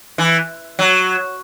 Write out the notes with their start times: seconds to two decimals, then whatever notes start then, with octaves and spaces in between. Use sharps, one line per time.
0.18 E3
0.79 F#3